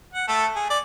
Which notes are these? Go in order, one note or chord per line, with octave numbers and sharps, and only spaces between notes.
F#5
A3 A4
G#4
D5